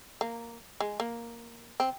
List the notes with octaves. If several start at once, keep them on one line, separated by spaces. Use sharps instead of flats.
A#3
G#3
A#3
C4